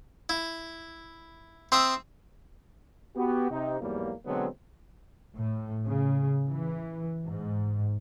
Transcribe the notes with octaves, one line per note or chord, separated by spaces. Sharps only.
E4
C4 E5 C6 D#6 E6
B3 F#4 G4
C3 D#4
E2 G#2 F#3 G3 A#3
B2 D3 F#3 G#3 B3 C4
A2
C#3
E3
G#2